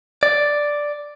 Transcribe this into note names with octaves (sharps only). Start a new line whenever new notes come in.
D5